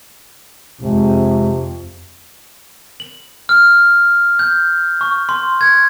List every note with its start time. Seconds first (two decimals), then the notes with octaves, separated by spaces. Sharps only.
0.81 F2 C3 G#3
3.00 F#7
3.49 F6
4.39 G6
5.01 C#6
5.29 C6
5.61 G#6